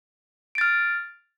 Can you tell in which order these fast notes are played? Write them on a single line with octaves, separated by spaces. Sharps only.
D7 A6 F6